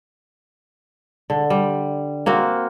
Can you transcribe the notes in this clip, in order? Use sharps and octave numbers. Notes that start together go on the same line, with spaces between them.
D3
G3
A#3 C4 F#4